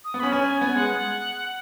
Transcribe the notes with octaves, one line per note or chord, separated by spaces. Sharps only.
D#6
B3
C#4 B5
C#4 G#5
B3 G#5
G#3 F#5